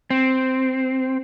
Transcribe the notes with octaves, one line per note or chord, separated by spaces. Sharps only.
C4